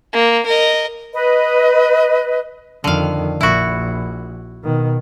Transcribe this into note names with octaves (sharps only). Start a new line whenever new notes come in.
A#3
A#4 D#5
B4 D#5
F2 D3 D#3 F5
A#1 E4 F#4
B2 D#3